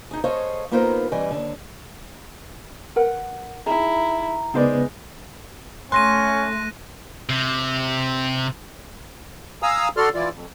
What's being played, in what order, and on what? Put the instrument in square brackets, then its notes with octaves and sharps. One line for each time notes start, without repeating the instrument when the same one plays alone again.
[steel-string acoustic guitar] D#4 G#4
G#4 A4 C5 C#5 D#5 F5
A#3 B3 D#4 F4 A#4 C5
E3 G3 C#4 D#5 G#5
D#2 D3
[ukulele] A#4 B4 F#5
[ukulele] D#4 G#4 [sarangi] E4 [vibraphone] A#5
[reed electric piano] C#3 B3 B4 [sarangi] G#3 [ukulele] D#4 C5 D5
[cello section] A3 [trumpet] C#4 [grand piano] C6 [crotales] F#6 A#6 D#7
[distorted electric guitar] C3
[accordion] F5 G#5 A#5 D#6 E6
F#4 A4 D5 C6 F6
E3 E4 F4 D5
F2